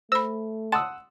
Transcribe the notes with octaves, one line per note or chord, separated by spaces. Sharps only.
A3 C5 B5 E6
F#5 A5 C6 D#6 E6